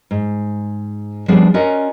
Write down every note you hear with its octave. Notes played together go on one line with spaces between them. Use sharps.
G#2
F3 G3 B3 C4 D4 G#4
C#4 F4 F#4 A#4 D5 D#5